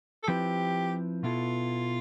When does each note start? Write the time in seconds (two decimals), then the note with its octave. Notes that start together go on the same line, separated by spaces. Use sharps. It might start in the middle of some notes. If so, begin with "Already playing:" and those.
0.23 A4
0.28 F3 C4 E4 G4 B4
1.23 B2 B3 E4 F4 A4